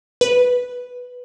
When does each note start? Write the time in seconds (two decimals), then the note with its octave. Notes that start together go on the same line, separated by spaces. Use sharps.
0.21 B4